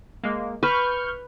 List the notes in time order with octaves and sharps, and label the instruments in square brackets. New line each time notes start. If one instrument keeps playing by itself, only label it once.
[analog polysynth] G#3 A#3
[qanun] B4 [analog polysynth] C#6 F6 G6